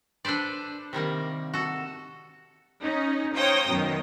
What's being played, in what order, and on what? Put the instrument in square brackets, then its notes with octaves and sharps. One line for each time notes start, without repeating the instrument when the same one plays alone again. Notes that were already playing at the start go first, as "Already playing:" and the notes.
[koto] D4 A4 B4 C5 D5
C3 D#3 G3 A#3
F#4 A4
[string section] C#4 D#4
C5 C#5 F5 G5 A#5 D#6
F#2 B2 D#3